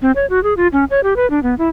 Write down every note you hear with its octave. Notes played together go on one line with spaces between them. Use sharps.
C4
C#5
F#4
G#4
F4
C#4
C#5
G4
B4
D4
B3
E4